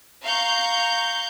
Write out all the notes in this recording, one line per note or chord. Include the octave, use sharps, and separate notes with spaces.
F5 A#5 C#6 G6